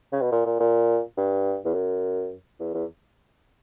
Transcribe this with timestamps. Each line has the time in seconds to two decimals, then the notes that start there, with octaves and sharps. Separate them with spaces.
0.13 C#3
0.22 B2
0.32 A#2
0.46 A#2
0.60 A#2
1.18 G2
1.65 E2
1.74 F#2
2.60 E2
2.74 E2